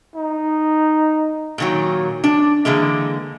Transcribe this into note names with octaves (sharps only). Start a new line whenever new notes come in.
D#4
A#2 D#3 F#3
D4
D3 E3 G#3 A#3